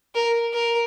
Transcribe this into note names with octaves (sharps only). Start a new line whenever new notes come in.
A#4
A#4